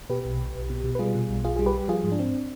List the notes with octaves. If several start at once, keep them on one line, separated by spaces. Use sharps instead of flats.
B2 G4 B4
B1
B1
B1
B2
B2
B4
G3 F4 G#4
B2
B1
B1 F4 G#4
G3 G#4
G4 B4
G3
F3 F4 G#4
G#2
D4
C4